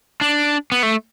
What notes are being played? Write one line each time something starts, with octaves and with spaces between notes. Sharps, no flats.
D4
B3
A3